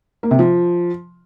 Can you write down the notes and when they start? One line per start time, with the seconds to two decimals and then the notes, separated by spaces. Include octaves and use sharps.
0.23 A#3
0.31 C3
0.39 F3